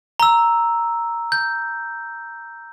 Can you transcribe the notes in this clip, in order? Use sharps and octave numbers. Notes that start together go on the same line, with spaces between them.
A#5 E6
G6